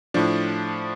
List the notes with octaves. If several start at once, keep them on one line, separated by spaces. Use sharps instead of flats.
A2 F3 D4